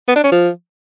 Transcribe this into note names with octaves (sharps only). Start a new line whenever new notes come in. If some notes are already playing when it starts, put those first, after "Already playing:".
B3
D4
C#4
F3